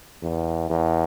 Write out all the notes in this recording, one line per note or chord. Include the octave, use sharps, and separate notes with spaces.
E2
E2